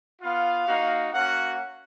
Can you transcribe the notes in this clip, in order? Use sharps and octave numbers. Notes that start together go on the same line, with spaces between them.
B3 F4 F5
A#3 D#4 F#4
A#3 C#4 F#4 F#5